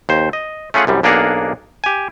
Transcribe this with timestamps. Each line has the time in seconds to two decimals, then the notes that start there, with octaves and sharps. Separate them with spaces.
0.09 D#2 C5
0.33 D#5
0.74 A3 C#4 F4 G#4 F#5
0.87 C2 F#2 G3
1.03 B1 A#3 D4 G#4 A#4 F#5
1.84 G4 G#5